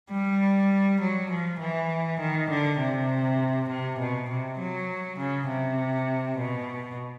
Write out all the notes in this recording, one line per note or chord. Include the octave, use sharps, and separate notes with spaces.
G3
F#3
F3
E3
D#3
D3
C3
C3
B2
C3
F#3
C#3
C3
B2